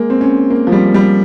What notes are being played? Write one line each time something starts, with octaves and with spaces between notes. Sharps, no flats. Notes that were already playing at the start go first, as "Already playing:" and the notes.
Already playing: G#3 A#3
C4
C#4
A#3
F3
G3
G3